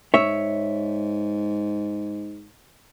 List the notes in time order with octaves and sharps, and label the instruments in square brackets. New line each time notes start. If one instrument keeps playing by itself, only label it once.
[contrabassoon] G#2 [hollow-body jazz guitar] C#5 E5